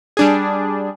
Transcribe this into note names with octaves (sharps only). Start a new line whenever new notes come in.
G3 D4 G#4